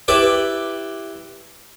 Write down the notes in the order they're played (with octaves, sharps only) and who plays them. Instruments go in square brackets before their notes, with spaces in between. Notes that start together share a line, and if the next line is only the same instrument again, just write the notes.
[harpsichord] E4 G4 B4 D5